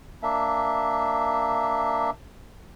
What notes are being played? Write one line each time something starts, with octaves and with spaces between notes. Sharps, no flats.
A#3 D4 E5